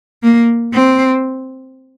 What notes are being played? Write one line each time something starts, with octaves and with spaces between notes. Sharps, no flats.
A#3
C4